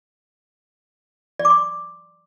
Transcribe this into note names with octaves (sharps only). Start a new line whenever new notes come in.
D5
D6
C6